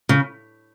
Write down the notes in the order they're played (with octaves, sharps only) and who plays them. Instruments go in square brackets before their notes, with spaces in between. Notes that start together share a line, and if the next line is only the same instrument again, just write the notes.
[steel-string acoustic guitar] C#3